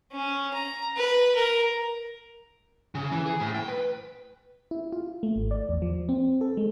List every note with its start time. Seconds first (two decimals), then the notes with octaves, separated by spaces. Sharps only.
0.12 C#4
0.54 A#5
0.97 B4
1.35 A#4
2.95 C#3
3.12 E3
3.26 G#4
3.41 A2
3.55 G5
3.68 B4
4.71 E4
4.92 F4
5.23 A3
5.36 G#1
5.51 D5
5.69 E2
5.82 F3
6.09 C4
6.41 A4
6.57 G#3